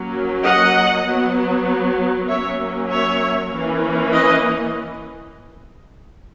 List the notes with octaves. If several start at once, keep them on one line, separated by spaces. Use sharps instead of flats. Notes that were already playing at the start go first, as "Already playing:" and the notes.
Already playing: F#3 A#3 C#4
D#5 F#5
F#3 B3
F#3 A#3 C#4 C#5 E5
C#5 E5
E3 A#3 C#4
B4 D#5